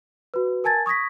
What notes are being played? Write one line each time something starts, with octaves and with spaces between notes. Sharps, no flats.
F#4 B4
A#4 G#5 A5 G#6 A6
C#6 D#6 G#6 A#6 B6